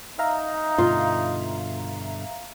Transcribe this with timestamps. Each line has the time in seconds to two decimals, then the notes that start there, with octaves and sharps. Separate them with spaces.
0.19 D#4 E5 F5 A#5
0.78 G2 B2 D3 F4